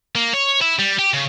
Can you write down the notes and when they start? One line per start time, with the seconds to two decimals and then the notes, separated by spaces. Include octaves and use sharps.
0.15 A#3
0.34 C#5
0.61 E4
0.79 G3
0.99 G4
1.13 C#3